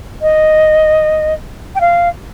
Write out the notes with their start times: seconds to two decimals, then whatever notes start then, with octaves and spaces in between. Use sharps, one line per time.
0.22 D#5
1.75 G5
1.81 F5